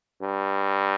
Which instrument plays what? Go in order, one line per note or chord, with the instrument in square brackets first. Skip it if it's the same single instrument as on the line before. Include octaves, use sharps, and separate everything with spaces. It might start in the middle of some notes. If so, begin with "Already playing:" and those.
[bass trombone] G2